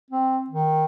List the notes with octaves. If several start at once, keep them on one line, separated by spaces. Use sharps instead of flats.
C4
D#3